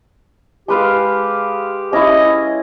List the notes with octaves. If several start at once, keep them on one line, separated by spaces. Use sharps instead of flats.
G#3 G4 B4 F5
C#4 E4 D#5